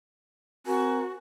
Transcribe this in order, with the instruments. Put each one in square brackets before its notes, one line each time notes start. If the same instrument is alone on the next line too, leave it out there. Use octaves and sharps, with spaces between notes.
[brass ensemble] C4 A#4 G#5 [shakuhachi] F#4